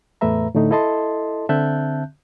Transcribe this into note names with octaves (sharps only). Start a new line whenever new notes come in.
E2 A2 A3 B4 E5 A#5
A2 D3 A3 D#4
E4 A4 D#5 A5 C6
D3 C4 E5 A5 F#6 G6